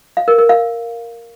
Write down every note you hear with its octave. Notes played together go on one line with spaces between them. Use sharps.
F5
A#4
A#4
F5